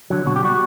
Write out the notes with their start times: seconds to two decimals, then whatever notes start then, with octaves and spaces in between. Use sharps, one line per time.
0.10 D3 F#3
0.26 B2 F#4
0.36 G4
0.43 G3 F#4